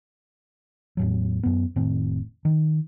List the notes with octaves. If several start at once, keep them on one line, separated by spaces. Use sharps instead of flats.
E2 A2 F#3
F#2 B3
F1 A2 D#3 C4
D#3